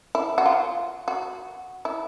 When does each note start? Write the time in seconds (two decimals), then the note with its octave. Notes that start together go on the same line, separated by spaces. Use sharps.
0.15 E4
0.38 F#4
0.46 F4
1.08 F#4
1.85 E4